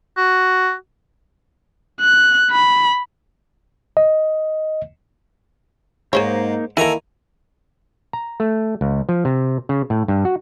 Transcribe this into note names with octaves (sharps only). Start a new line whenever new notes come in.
F#4
F#6
B5
D#5
G#2 A#3 D#4 G#4 C5 C#5
D#3 E3 A#3 A4 G#5 A#5
A#5
A3
C#2
F3
C3
C#3
A2
G2
F#4